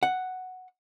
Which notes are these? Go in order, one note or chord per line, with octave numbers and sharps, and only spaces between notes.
F#5